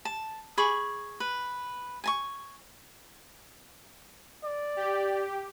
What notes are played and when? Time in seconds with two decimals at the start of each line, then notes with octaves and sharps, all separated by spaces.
0.05 A5
0.58 G#4 B5 C#6 D6
1.20 B4
2.04 G#5 A5 C#6
4.44 D5
4.76 G4